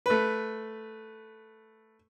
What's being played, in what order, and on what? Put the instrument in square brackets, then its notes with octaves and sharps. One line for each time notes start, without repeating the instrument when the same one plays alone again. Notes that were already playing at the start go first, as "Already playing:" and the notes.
[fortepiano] A3 B4